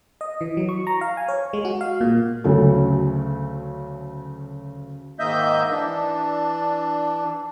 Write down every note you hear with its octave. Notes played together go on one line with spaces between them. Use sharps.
D#5
E3
F#3
C#6
A#5
F5
G#5
C#5
G#3
F#4
F5
A#2
D2 C#3 F#3 A3
G#2 D#3 A#3 D#5 E5 G6
E3 D4